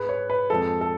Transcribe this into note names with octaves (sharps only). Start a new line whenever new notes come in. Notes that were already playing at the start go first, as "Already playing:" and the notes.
Already playing: G#2 G#3 B4
C#5
B4
F2 F3 G#3 A4
A4